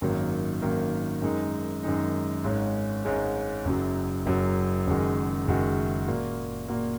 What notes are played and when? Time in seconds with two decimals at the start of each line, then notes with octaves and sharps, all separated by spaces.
0.01 G#1 F#2 D#3 F#3 A#3
0.62 G#1 F#2 D#3 F#3 A#3
1.22 F#2 D#3 G#3 D#4
1.83 F#2 D#3 G#3 D#4
2.44 G#1 G#2 G#3 C#4
3.05 G#1 G#2 G#3 C#4
3.65 F#1 F#2 F#3
4.26 F#1 F#2 F#3
4.87 F#1 F#2 D#3 G#3 F#4
5.47 F#1 F#2 D#3 G#3 F#4
6.07 A#2 A#3 F#4
6.68 A#2 A#3 F#4